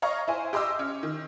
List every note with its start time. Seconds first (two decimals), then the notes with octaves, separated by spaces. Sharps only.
0.02 C#5 D#5 F5 A#5 C#6
0.28 E4 C5 G#5
0.53 G4 D#5 C6 D6 E6
0.79 C#4
1.03 D#3